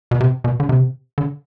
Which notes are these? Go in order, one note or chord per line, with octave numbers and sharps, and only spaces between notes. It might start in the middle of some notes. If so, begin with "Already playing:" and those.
B2
C3
B2
D3
C3
D3